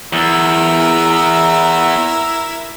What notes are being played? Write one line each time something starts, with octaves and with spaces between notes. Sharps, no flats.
E2 E4 A#4 E6